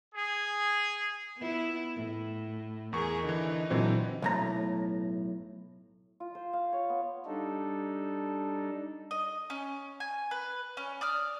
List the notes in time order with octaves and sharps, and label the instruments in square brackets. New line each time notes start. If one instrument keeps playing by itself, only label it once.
[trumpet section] G#4
[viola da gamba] B3 E4
A2
[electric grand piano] E2 C#6 [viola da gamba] G#4 A#4
[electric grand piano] D3 E3 [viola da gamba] D#4
[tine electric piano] A#2 C4 C5 [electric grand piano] D3 E3 F#3
[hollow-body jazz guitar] B1 A2 A#5
[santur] F4
C5
F5
C#5
B3
[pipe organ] G3 D4 D#4 A4
[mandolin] D#5
C#4
G#5
B4
C#4
D5 D#6 F6